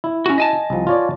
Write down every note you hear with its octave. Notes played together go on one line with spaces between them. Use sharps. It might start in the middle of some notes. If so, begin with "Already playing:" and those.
E4
C#4 F#4
D#5 G#5 A5
C2 F3
F4 C#5 D5